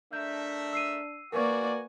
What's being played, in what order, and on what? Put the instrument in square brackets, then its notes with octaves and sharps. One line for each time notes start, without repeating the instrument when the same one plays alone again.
[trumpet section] A3 A#4 E5 [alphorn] D4 [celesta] G6
[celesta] E6 C7 D#7
[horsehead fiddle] A#3 D5 [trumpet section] F#4 G#5 [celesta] A#4 B4 C#6